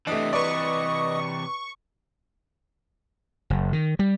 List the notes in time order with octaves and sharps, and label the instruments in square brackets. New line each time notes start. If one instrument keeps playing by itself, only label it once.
[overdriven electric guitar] C3 E3 [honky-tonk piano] A3 D4 [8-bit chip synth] D#5 D#6
[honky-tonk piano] B4 D5 [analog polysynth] C#6
[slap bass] F#1
D#3
G3